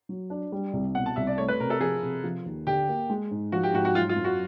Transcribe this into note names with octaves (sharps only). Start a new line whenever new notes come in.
F#3
D4
G3
C2
B2 F#5
A5
C2 E5
D5
A3 C#5
B4
C3 A#4
A4
F3 G#4
C3
F3
D#2
D3 G4
A#3
G#3
G#2
F3 F#4
G4
G#2 F#4
F#4
F#3 F4
F4
F#2
F#4